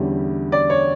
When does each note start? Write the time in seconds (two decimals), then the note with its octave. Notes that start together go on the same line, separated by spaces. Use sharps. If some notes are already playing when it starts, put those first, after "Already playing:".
Already playing: E2 D3 G3 C#4 E4
0.52 D5
0.70 C#5